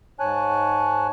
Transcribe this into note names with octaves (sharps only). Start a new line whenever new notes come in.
G#2 C#5 G#5 A5 F#6